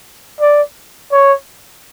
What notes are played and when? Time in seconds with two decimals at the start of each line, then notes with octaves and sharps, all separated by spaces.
0.40 D5
1.12 C#5